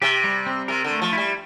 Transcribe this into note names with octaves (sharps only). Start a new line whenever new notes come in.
C3 G4
G3
C4
C3 A#4
D3
A3
F3
G3 E4